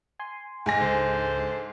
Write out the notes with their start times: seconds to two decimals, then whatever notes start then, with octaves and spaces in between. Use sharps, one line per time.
0.19 G#5 C6
0.66 G#2 G#5 A#6
0.81 C#2 D4 A4 C5